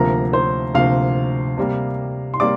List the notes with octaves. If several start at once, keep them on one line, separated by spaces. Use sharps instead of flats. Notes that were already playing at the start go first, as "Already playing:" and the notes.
Already playing: D2 C3 F3 A#3 A#4 A#5
C5 C6
D2 C3 F3 A#3 F5 F6
C3 G3 A#3
C6
C3 G3 A#3 D5 D6